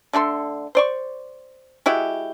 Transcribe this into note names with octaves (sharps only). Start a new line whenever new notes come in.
D3 A3 A4 C6
C5 D5 C#6
G#3 E4 F#4 G4